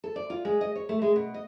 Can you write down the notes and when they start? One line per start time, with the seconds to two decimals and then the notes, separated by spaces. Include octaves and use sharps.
0.04 A4
0.16 D5
0.30 F4
0.45 G#3
0.61 D#5
0.75 C#5
0.89 A3
1.02 G#3
1.16 B2
1.34 D#5